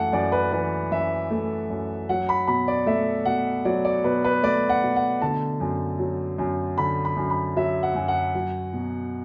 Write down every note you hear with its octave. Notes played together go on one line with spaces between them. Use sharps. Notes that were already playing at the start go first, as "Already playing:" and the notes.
Already playing: F#2 E3 A3 F#5 A5
F#2 D5
B4
E3 B4
F#2 E5
A3
F#2
F#3 F#5
B5
B2 B5
D5
A3 E5
B2 F#5
F#3 D5
D5
B2 B4
B4
A3 D5
F#5
B2
F#5
D3 A5
F#2
F#3
F#2
D3 B5
B5
F#2
B5
F#3 E5
F#5
F#2
F#5
F#3
B2